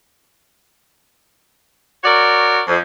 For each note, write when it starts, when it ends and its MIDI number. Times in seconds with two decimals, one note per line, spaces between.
2.04 2.61 66
2.04 2.61 70
2.04 2.61 73
2.04 2.61 74
2.68 2.78 41